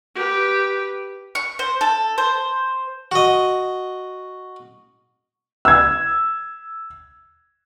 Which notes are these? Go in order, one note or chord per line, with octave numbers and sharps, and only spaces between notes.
G4 B4
C#6
C5
A4
C5
F#4 D#5
E6 G#6